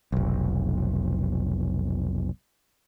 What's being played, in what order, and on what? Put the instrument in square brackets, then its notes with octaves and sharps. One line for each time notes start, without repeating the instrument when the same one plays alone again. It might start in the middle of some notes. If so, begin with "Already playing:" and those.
[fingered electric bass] F1 B1